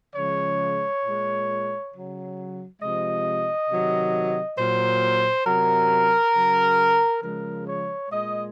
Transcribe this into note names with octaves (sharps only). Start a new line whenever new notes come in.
C#3 F3 G#3 C#5
A#2 G#3
C#3 F#3
C3 F3 G#3 D#5
C3 D#3 F#3
A#2 F#3 C5
C3 F#3 A#4
C#3 F#3
C#3 F3 G#3 A#4
C#5
A#2 G#3 D#5